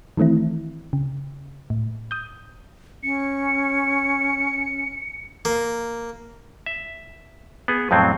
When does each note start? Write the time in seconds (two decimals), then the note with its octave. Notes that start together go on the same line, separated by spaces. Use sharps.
0.17 D#3 E3 A3 C4 E4
0.93 C#3
1.70 A2
2.11 D#6 G6
3.03 C#4 C#7
5.45 A#3
6.66 E5
7.68 B3 G#4
7.91 F2 A2 F#3 C4